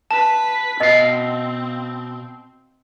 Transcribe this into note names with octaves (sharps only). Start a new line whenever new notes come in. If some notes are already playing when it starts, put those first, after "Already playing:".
B4 A5 B6
B2 C4 D#5 F5